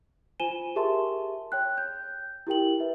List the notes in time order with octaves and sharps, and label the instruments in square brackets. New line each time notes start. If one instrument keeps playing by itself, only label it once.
[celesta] F4 C5 G#5 D#7 E7 G7
G4 G#4 A#4 E5 A5 C6
C#5 G5 F#6
G6
E4 G4 A#4 G5 F#7
B4 E5